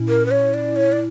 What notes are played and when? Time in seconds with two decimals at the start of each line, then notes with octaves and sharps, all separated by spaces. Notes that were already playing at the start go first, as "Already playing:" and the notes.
Already playing: A#2 C#4 E4
0.08 A#4
0.26 B4
0.31 C#5
0.54 D5
0.76 C#5
0.92 D5